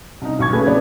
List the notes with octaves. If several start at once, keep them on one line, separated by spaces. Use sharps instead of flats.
C2 D#4
D#1 B1 C#6 G#6
D#1 C#3 A3 G#4 B4 G#6
F2 B3 D5